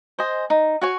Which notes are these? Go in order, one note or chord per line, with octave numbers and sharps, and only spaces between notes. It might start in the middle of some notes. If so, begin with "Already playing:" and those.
C5 D#5 G#5
D#4
F#4 C#5 G#5